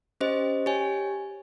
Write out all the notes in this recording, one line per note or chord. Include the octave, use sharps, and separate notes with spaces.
C#4 G4 C5 D#5
G4 C#5 G#5